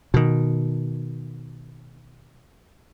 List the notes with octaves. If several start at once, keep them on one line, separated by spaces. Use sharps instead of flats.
B2 D#3